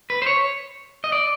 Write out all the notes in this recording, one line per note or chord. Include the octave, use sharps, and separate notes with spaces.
B4
C5
C#5
D#5
D5